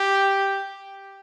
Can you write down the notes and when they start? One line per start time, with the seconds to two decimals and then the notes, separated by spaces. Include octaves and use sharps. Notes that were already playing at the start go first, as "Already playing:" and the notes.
Already playing: G4